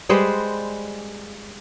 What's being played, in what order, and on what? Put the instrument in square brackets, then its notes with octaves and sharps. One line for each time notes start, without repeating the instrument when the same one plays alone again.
[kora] G3 G#3 B4 C5